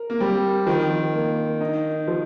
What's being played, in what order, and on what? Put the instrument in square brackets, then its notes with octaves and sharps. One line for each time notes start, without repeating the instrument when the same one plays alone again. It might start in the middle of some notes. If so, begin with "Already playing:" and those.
Already playing: [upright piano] A#4
[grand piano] A#3
[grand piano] G3 [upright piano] C4
[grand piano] D#3 [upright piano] F3
[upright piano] A#3
D#4
F3